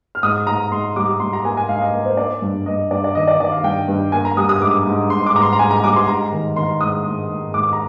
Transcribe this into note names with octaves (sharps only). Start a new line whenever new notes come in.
F6
G#2 D#6
G#2 A#5
G#2 C6
G3 D6
G3 C6
A#5
A#3 G#5
G#5
G#2 F5
D#5
A#3
C5
A#3 D5
G2
G2 D#5
G2 D5
D5
D#3 D#5
D5
D#3 D5
F5
G2 G5
G2
A#3 G#5
A#5
G3 D#6
D#6
G#2 D6
G#2
G#2 C6
D6
G#2 A#5
C6
A#5
G#2 G#5
A#5
G3 D6
C6
G#2 A#5
D#3
D#3 C6
G#2 D#6
G#2
G#2
G#2 D6
A#5